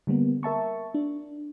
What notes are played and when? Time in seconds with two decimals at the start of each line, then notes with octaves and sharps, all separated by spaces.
0.07 D3 G3 A#3 B3
0.43 A#4 E5 A5 C#6
0.94 D4